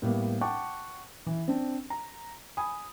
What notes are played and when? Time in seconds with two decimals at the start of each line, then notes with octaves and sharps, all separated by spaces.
0.02 A2 G3 A#3 B3
0.41 F#5 G5 A5 C#6 D6
1.26 E3
1.48 C4 D4
1.90 A#5
2.57 G#5 B5 D#6